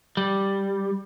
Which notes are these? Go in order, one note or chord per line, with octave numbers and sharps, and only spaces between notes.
G3